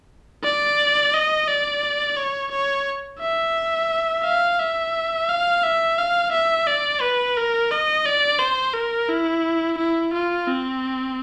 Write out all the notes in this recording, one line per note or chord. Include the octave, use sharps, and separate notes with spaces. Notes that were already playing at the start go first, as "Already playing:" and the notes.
D5
D#5
D5
C#5
C#5
E5
F5
E5
F5
E5
F5
E5
D5
B4
A#4
D#5
D5
C5
A#4
E4
E4
F4
C4